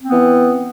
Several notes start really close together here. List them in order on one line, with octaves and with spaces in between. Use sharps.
C4 B3 E3